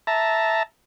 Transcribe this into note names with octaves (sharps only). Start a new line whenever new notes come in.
E5 A5 A#5